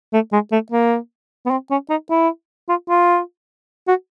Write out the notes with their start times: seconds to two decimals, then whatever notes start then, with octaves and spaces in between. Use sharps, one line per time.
0.13 A3
0.32 G#3
0.52 A3
0.72 A#3
1.46 B3
1.50 C4
1.70 C#4
1.90 D#4
2.10 E4
2.68 F4
2.89 F4
3.88 F#4